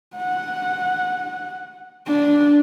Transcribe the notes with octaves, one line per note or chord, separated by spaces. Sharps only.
F#5
D4